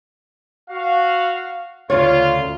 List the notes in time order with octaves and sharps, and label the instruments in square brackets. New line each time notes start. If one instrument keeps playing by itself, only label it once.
[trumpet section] F#4 F5
[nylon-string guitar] D2 C#3 C#5 [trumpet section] F4